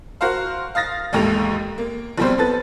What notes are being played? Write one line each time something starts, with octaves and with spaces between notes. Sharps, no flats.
F#4 A#4 C5 F5
F5 D#6 A6 A#6
A1 D#2 G#2 A3 F7
A#3
A#1 B2 G3 C4 C5
B3 A4 B4 A6